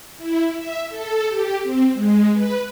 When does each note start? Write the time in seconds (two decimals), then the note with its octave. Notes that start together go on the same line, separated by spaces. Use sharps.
0.18 E4
0.56 E5
0.89 A4
1.28 G4
1.63 C4
1.94 G#3
2.33 B4